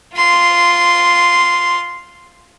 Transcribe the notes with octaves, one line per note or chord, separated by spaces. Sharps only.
F4 C6